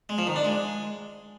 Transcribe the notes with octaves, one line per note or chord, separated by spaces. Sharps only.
G#3
F3
D#3
D4
G#3